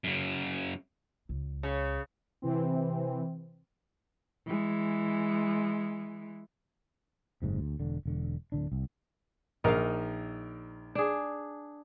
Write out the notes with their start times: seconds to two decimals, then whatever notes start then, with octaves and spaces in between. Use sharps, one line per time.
0.04 F#2 C#3
1.29 C#2
1.63 C#3
2.42 C3 E3 C4
4.47 E3 G#3
7.42 F#1 G#2 C3
7.58 D2
7.80 E1 D3
8.06 E1 D3
8.52 D1 D3 D4
8.72 C2
9.64 A#1 D#4 A#4 F5
10.95 D4 G#4